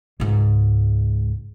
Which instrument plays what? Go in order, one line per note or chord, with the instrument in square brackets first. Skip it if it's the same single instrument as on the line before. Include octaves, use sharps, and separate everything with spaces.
[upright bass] C#2 G#2